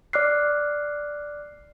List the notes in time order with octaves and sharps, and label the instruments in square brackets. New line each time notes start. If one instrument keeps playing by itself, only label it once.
[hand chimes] D5 D6 F6 F#6 C7